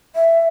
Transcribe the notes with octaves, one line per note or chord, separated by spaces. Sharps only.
E5